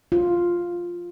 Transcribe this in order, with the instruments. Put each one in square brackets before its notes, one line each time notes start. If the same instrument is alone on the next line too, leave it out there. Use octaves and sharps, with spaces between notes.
[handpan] F4